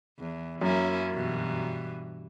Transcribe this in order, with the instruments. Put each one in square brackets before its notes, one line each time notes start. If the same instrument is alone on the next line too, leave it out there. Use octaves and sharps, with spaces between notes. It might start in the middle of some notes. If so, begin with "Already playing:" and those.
[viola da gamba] E2
[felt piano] F#2 [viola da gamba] A#3 C#4 E4
[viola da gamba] G2 B2 E3